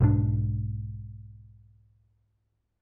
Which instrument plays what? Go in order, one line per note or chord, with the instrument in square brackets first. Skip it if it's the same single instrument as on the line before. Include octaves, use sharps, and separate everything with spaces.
[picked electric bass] B1 G#2 D#3 D4